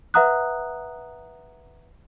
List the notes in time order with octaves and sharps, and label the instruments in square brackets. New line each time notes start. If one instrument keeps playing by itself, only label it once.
[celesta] B4 E5 F#5 A#5 D#6 F#6